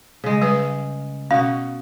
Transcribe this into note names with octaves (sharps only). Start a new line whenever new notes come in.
C#3 G#3
G3 G#4 B4
B2 C#4 F#4 F5